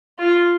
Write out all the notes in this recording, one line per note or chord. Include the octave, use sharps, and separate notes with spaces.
F4